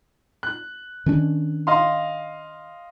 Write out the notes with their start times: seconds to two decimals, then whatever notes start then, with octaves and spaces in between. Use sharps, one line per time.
0.43 F#6
1.06 D#3 C#4 D4
1.67 D#5 F5 C6